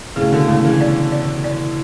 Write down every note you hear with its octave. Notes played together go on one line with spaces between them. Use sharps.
A2 C#3 G#4
B2 D3
A2 C#3 G#3
C#3 E3
D5
D5
D5